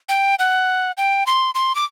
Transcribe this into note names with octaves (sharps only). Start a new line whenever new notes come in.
G5
F#5
G5
C6
C6
D6